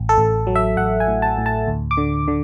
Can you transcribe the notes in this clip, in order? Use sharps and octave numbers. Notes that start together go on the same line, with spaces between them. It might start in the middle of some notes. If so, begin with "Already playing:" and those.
Already playing: A1
A4
A1
F#3
E5
A1 F#5
G#5
A2
A5
A2
A5
D2
D6
D3
D3